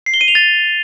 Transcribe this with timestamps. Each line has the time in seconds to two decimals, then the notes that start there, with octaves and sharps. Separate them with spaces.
0.06 C7
0.14 G7
0.21 D#7
0.28 F7
0.35 A6